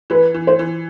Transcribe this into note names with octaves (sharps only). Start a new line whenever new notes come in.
E3 B4
E3
C5
E3